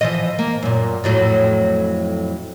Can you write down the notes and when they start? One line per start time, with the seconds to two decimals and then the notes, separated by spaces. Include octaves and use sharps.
0.01 E3 F3 D#5
0.39 A#3
0.63 F#2 A#2
1.04 F2 A2 F#3